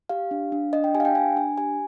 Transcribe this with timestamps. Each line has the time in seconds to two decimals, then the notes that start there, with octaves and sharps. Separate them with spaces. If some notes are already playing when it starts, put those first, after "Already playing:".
0.09 G4 F5
0.31 D4
0.52 D4
0.73 D4 D#5
0.84 G5
0.95 G4 G#5
1.00 F5
1.05 G5
1.15 D4 G#5
1.36 D4 G#5
1.58 G4 G#5